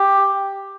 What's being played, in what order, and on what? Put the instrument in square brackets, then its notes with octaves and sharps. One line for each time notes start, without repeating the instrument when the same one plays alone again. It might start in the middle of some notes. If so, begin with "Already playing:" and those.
Already playing: [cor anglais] G4